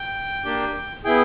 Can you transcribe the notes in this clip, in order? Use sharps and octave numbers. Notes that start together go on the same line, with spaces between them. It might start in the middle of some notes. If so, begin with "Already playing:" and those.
Already playing: G5
A#3 D4 G4
B3 E4 G#4 G5